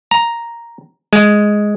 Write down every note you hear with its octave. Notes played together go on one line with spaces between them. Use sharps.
A#5
G#3